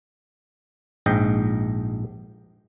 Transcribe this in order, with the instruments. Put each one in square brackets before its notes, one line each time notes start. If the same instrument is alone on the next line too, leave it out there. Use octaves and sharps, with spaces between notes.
[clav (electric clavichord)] A#1 G#2 D#5 G5